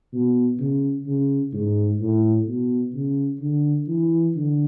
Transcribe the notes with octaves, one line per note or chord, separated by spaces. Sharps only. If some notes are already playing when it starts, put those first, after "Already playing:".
B2
C#3
C#3
G#2
A2
B2
C#3
D3
E3
D3